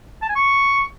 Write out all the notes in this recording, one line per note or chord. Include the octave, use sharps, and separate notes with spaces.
A5
G#5
C#6